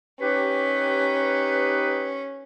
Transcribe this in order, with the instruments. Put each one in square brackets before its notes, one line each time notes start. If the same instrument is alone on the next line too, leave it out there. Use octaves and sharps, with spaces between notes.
[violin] C#4 [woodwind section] D#4 G4 B4